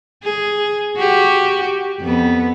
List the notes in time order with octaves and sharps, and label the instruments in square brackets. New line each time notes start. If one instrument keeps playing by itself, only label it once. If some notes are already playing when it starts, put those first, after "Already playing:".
[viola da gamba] G#4
F#4 G4
F2 B3